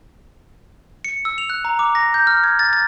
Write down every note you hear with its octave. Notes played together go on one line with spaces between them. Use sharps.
C#7
E6
F7
F#6
A#5
D6
A#6
G6
F6
G#6
A6
A6